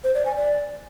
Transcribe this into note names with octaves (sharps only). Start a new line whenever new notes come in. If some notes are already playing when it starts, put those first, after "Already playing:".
C5
D5
G#5
D5